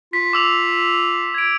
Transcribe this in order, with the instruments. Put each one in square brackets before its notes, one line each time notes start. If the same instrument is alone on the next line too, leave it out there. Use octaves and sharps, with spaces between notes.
[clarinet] F4 [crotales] B6
[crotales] D6 E6 F7
G#6 D7